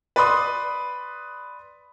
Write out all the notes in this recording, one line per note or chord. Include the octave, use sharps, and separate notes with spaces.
B4 D5 B5 C6 D#6